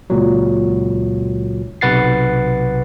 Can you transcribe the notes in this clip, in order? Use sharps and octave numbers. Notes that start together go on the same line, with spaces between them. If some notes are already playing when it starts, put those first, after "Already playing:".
C#2 A#2 F#3
B1 C3 B4 F#5 A6 C7